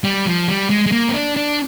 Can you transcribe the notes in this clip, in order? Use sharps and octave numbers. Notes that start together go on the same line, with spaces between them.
G3
F3
G3
G#3
G#3
A#3
C4
D4
D4